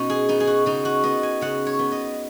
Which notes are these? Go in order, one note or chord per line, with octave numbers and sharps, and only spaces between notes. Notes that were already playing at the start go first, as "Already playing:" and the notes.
Already playing: B2 B3 C#4 D#4 F#4
G#4
B3 D#4
G#4
F#4
C#3 D#4
F#4
B3 D#5
G#5
C#3 F#5
C#5
B3
D#5